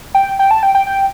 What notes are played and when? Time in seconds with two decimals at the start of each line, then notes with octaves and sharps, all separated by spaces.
0.15 G5
0.39 G5
0.51 A5
0.63 G5
0.75 G5
0.87 G5